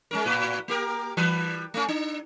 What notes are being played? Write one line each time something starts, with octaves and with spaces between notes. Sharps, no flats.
G#3 C#4 A#4
A2 F#4 B4
A#3 G4 A#4
E3 G3 B4
A3 C#4
D4